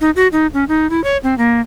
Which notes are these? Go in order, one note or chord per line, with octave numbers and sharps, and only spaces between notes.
D#4
F#4
D#4
C#4
D#4
E4
C#5
C4
A#3